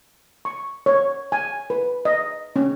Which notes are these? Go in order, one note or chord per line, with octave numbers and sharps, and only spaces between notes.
C#6
C#5
G#5
B4
D#5
C#4